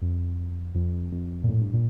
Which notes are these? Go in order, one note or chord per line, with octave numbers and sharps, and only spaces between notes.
F2
F2
F2
A#2
A2
G2
A#2